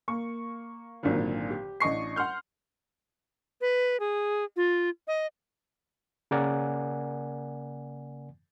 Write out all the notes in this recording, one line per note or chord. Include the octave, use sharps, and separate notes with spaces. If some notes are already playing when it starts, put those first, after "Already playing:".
A#3 C#6
G#1 A#2 D3 D#3 F#3
G4
A1 D4 D#5 C#6 C7
F#5 C6 F6 G6
B4
G#4
F4
D#5
C#3 A#3 A#4 D5 F#5 G#5